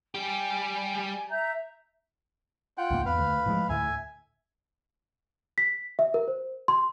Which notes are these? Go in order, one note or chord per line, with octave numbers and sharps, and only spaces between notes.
G3 G4 G#5
E5 A#5 G6
F4 F#5 G5
C#2 G#2 A#3
E2 B4 F5
D2
A2 F3 G#3
D2 A2 D3 E5 G#5
B6
E5
A#4
C5
C6